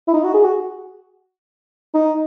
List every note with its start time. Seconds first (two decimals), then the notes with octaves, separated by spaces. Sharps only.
0.08 E4
0.14 D#4
0.24 F#4
0.34 G#4
0.44 F#4
1.94 D#4